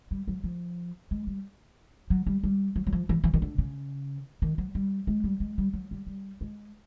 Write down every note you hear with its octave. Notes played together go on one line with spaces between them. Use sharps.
G3
F#3
F3
G#3
G3
F#3
G3
G3
F#3
F#3
F3
E3
E3
D#3
D3
C#3
D#3
F#3
G3
G#3
G3
G#3
G3
F#3
G3
G3
G#3